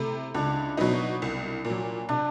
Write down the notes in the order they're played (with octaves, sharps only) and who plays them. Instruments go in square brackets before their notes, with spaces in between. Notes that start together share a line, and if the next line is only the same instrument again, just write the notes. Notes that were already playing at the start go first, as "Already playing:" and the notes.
Already playing: [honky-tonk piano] C3 A3 [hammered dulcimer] E4
[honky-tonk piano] C#2 [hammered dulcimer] D4
[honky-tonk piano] B2 F#3 B3 D#4
C2
A#2
F#3
[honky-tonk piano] C3 [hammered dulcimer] D4